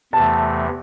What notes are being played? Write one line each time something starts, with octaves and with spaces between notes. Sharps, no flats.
E2 C3 E3 A3 A5